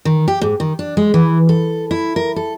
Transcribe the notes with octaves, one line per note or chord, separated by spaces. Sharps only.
D#3
G4
G#2
D#3
D4
G#3
E3
A4
E4
A#4
A4